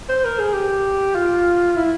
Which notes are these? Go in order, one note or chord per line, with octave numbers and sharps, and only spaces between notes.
C5
A#4
G#4
G4
F4
E4